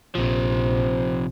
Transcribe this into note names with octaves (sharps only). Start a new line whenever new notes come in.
A#1 C3 F3 C5